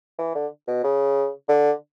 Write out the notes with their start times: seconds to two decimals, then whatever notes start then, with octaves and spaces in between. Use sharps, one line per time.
0.19 E3
0.35 D3
0.68 B2
0.84 C#3
1.49 D3